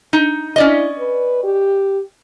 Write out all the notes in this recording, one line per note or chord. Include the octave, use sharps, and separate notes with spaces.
D#4
C#4 E4 D5 D#5
B4
G4